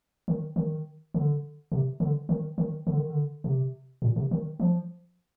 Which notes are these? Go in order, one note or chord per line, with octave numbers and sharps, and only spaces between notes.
D#3
D#3
D3
C3
D3
D#3
D#3
D3
D#3
D3
C3
A#2
C3
D#3
F3